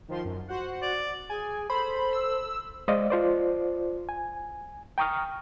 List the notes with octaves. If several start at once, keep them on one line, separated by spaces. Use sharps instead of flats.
D#3 F3 C6
F#2
F#4 C5 F#5
D5
G#4 G#5
A4 C5 B5
E6
G#3 C5 D5 D#5 F5
F4 C5 D5
G#5
G5 A#5 C#6 D#6 F6